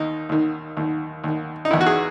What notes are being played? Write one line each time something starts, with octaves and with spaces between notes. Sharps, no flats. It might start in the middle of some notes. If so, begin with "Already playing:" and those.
Already playing: D#2 D#3 D#4
D#2 D#3
D#2 D#3
D#2 D#3
D#4
E2 D#3 E4
F#4
G#4